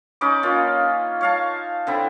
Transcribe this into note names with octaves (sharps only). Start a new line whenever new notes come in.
C#4 D#4 B5 D6
A#3 C#4 F4
C#5 F5 A5
D3 C4 E4